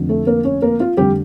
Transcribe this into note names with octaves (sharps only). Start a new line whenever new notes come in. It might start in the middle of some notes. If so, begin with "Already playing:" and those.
Already playing: F1 F2 D3
A3 A4
A#3 A#4
C#4 C#5
A#3 A#4
F4
F1 D3 G3 G4